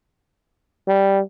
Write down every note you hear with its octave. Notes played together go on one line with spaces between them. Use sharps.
G3